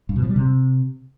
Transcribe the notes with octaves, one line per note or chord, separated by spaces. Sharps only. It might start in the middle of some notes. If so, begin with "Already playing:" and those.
G2
B2
F3
G3
C3